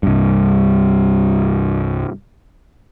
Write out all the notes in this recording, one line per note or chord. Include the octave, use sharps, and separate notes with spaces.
C2 G2